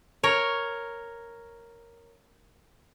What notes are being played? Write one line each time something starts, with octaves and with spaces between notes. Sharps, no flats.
A#4 C#5